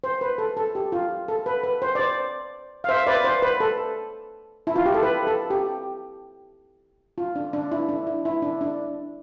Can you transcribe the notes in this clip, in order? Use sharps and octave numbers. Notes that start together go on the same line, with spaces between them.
C5
B4
A4
A4
G4
F4
A4
B4
B4
C5
D5
C5
F5
C5 E5
B4 D5
C5
B4
A4
E4
F4
G4
A4
B4
A4
G4
F4
D4
D4
E4
D4
E4
E4
D4
D4